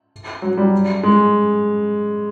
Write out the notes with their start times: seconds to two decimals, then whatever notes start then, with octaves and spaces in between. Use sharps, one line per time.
0.42 F#3
0.57 G3
1.03 G#3